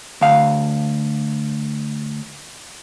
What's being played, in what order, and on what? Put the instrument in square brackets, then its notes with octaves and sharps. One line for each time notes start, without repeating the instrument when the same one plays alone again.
[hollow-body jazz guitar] D2 F5